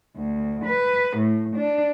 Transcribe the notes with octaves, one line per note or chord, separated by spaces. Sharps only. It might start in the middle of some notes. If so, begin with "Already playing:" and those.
D2
B4
A2
D4